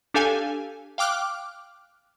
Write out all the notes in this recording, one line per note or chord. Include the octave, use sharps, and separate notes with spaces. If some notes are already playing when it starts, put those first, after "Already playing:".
D4 G4 A4 F5 G#5
F5 G5 D6 F6 F#6